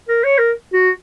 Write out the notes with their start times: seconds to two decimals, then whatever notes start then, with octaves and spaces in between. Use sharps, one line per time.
0.09 A#4
0.24 C#5
0.38 A#4
0.73 F#4